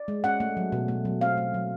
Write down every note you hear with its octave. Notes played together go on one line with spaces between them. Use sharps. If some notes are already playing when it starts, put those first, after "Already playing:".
Already playing: D5
G#3
C#4 F#5
A3
F#3
B2
A3
F#3
C4 F5
A3
F#3